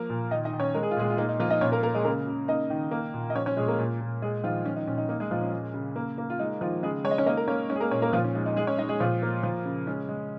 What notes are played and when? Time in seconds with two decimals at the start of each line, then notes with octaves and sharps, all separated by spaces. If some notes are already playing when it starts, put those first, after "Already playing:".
Already playing: F3 A#3 A#4
0.10 A#2
0.31 D#3 D#4 D#5
0.45 D#4 D#5
0.53 D#3
0.60 C#4 C#5
0.74 G#3 A#4
0.83 G#4
0.91 F4
0.96 A#2 G#3 G#4
1.10 F4
1.18 A#3 D#4
1.29 D#4
1.40 F3 A#3 F4
1.50 D#4 D#5
1.61 A#2 C#4 C#5
1.72 A#3 A#4
1.83 A#3 A#4
1.94 G#3 G#4
2.05 C#3 A#3 A#4
2.27 C#3
2.48 A#3 D#4 D#5
2.70 D#3
2.91 A#3
3.14 A#2
3.30 D#5
3.35 F3 C#4 C#5
3.46 C#4 C#5
3.57 A#2 G#3 G#4
3.68 A#3 A#4
3.79 A#2
4.00 A#2
4.22 G#3 G#4
4.43 D#3 F3 F4
4.66 F3 C#4
4.76 D#4
4.87 A#2 C#4
4.98 D#4
5.09 A#3 D#4
5.20 G#3 G#4
5.31 A#2 F3 F4
5.41 C#4
5.52 G#3
5.74 C#3
5.96 A#3
6.18 A#3
6.30 F4
6.39 G#3 D#4
6.61 D#3 F3 F4
6.82 C#3 G#3 G#4
7.04 G#3 C#5
7.11 D#5
7.18 C#4 C#5
7.26 A#3 D#4 D#5
7.37 A#4
7.48 A#3 C#4 C#5
7.70 G#3 C#4 C#5
7.76 G#4
7.80 A#3 A#4
7.91 A#2 C#4 C#5
8.02 A#3 A#4
8.13 A#2 F3 F4
8.24 C#4
8.35 G#3 D#4
8.46 D#4
8.56 G#3 G#4
8.67 C#4 C#5
8.78 G#3 D#4 D#5
8.89 G#3 G#4
9.00 A#2 F3 F4
9.22 A#3
9.43 F3
9.65 C#3
9.87 G#3 C#4
10.09 G#3